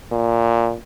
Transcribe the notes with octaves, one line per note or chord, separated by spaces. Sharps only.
A#2